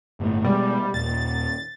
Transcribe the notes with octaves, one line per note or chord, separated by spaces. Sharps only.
G1 A2
B2 G3 G#3
D#1 A6